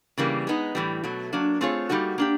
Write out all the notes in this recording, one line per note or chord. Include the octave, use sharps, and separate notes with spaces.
C#3 E3 G3 A#3
G#3 B3 D#4
A2 E3 G3
B2 F#3 A3
F#3 A#3 D4
A3 C4 F4 G#4 C#5
G3 A#3 D#4 F#4 A4
A#3 D4 G4